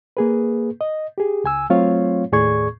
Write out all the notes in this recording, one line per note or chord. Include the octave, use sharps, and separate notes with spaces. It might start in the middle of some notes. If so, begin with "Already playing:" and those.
A#3 G#4 B4
D#5
G4 G#4
C#2 G#5 E6
F#3 A3 C4 F4 C#5 F5
D#2 A2 G#4 D5 C#6 G#6